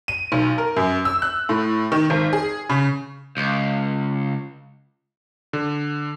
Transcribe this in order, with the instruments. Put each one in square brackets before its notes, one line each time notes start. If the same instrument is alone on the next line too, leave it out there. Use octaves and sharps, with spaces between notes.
[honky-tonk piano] D#7
B1
A#4
F#2
E6
F#6
A2
D#3
G#1
G#4
C#3
[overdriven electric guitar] C#2
[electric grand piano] D3